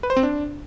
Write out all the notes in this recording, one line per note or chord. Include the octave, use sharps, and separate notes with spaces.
B4
C5
C4
D4